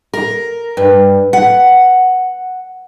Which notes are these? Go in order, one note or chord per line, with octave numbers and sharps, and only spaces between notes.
A#4
G2
F#5